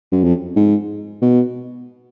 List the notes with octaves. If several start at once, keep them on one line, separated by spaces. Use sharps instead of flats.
F#2
F2
G#2
B2